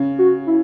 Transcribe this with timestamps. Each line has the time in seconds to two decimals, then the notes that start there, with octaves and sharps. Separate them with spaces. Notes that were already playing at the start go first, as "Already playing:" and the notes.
Already playing: C#3
0.18 F#4
0.47 E4